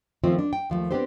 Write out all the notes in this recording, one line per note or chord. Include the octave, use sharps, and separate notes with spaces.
D#3 F3 A3 C4 C#4 F4
D4
G5
D#2 F3 F#3 A3
B3 C4 D4 G4 A4 C5